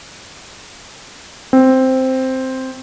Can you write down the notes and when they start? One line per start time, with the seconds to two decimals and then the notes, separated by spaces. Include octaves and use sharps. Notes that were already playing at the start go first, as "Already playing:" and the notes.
1.53 C4